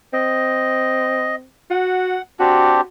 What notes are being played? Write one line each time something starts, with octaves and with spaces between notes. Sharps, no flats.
C4 D#5
F#4 F#5
C4 D4 F#4 G4